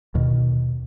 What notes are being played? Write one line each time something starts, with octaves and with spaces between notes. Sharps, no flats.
D#2 B2 D#3